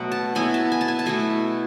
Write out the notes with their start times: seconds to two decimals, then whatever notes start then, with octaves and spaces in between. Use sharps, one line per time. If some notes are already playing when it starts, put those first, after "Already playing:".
Already playing: B2 F#3 A3 F#5
0.12 A5
0.35 B2 F#3 B3 E4 G#5
0.54 A5
0.72 G#5
0.81 A5
0.88 G#5
0.99 A5
1.06 B2 A3 E4 G#5